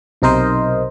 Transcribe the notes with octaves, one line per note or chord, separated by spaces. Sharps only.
B1 C3 D#4 A#4 C5 D#5